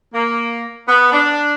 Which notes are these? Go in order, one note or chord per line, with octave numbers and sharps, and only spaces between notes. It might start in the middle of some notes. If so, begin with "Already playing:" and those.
A#3
B3
D4